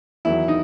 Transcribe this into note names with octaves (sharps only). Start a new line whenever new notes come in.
E2 D#3 F#3 E4
D#4